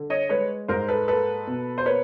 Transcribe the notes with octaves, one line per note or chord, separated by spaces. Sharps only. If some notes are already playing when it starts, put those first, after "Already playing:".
Already playing: D3
C#5 D#5
G#3 B4 C#5
G#2 A#4 C5
A4 B4
A#3 A4 B4
B2
C5
A#3 B4 C#5